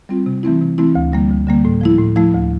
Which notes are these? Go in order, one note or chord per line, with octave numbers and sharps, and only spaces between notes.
G3 C4 F4
C3
E3 A3 C4 E4
C3
E3 A3 C4 E4
D2
D3 G3 A#3
D2
D3 G3 A#3
A2
F3 A3 E4
A2
F3 A3 E4
D2